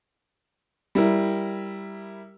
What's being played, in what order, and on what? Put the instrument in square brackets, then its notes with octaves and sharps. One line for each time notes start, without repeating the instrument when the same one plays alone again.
[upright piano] G3 E4 A#4